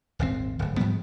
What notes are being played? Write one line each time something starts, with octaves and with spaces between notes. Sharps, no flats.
D#1 G#1 A#2 C4
D1 G#1
G#2 F3 G3 B3